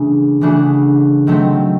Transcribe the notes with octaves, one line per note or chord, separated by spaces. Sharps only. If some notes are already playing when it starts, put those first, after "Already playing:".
Already playing: C#3 E3 A3 D4
C#3 E3 A3 D4 F#4
D#3 F#3 A3 C4